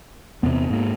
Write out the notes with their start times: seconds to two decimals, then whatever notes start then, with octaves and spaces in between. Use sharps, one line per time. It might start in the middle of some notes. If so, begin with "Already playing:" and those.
0.43 E2 C3 B3
0.70 G#2 A#3